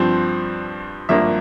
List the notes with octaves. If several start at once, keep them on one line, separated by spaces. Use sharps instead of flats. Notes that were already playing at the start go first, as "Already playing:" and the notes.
Already playing: G2 F3 C4
G#1 G2 F3 A#3 E5